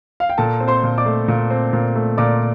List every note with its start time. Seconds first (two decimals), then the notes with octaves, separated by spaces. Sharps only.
0.20 F5
0.30 G5
0.38 A#2 A4 A5
0.60 C4
0.68 C5 C6
0.83 A#2
0.98 D5 D6
1.06 A3
1.28 A#2
1.50 C4
1.73 A#2
1.95 A3
2.18 A#2 D5 D6